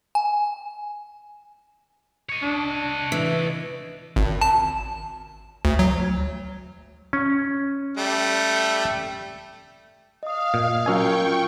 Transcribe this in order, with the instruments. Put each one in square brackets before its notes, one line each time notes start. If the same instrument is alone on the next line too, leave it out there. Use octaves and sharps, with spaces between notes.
[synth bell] G#5
[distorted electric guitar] C#5 D#5
[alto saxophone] D4
[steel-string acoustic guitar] E3 [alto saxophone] E4
[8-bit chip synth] G#1
A5
D2
F#3
[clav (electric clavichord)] C#4
[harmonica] G3 A3
[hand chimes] D#5 D#6 [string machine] F5
[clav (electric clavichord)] A#2
[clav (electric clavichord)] F#3 C#4 G#5 [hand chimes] F4 A#4 E6 [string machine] G5 C#6